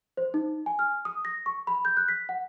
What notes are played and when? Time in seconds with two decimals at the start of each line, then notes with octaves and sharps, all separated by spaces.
0.17 C5
0.34 D#4
0.66 G#5
0.79 F6
1.05 D#6
1.25 A#6
1.46 C#6
1.67 B5
1.85 G6
1.97 F#6
2.08 B6
2.29 F#5